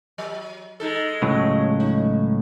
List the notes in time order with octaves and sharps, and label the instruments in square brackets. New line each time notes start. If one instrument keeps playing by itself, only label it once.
[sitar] F#3
G#3 D#4 A4
[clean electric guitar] C#2 A2 F#3
[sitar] D#4